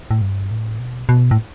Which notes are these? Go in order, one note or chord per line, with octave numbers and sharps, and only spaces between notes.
A2
G2
A2
B2
B2
A2